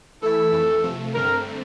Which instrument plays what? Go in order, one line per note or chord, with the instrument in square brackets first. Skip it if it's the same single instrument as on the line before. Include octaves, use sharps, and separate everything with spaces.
[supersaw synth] E3 A3 E4 [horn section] A4
[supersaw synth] F2 E3 A3
C3 F3 A3
[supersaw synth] G2 D3 A3 C4 [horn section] A#4